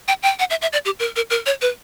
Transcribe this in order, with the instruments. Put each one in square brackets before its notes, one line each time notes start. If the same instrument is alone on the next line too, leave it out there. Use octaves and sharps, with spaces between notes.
[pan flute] G5
G5
F#5
E5
E5
D5
G4
A#4
A#4
A#4
C#5
B4